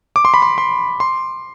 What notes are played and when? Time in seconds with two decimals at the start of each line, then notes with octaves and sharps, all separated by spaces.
0.16 D6
0.25 C6
0.34 B5
0.42 C6
0.58 C6
1.00 C6